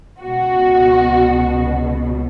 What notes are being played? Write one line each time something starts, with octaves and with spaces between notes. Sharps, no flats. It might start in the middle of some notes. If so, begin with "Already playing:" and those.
C#2 B2 F#4